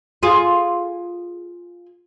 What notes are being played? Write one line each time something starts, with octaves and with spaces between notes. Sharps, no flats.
F4 G#4